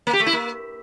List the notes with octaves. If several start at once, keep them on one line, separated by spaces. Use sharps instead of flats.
A#3
G4
A3
E4
A#3